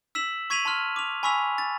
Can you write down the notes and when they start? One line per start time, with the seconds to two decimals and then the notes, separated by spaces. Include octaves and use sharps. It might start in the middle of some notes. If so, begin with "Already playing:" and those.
0.15 E6 B6 E7 F#7
0.50 C#6 G#6 B6 D#7 F7 F#7
0.65 A5 C6 F6
0.96 D6 F7
1.23 G#5 B5 C#6 E6 B6 F7
1.58 A6